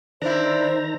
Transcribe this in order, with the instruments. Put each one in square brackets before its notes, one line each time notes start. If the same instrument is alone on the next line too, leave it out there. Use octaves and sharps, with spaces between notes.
[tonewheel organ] D#3 A#5 [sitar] D4 E4 [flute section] C5